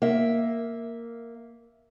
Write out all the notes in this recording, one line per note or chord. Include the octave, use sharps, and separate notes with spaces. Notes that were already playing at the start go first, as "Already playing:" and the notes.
A#3 E5